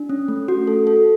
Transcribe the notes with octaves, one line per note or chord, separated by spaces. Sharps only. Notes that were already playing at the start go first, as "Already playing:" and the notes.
Already playing: D4
C#4
A3
F#4
A4
A4